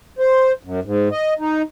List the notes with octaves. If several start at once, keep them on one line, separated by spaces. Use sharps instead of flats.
C5
F#2
G#2
D#5
D#4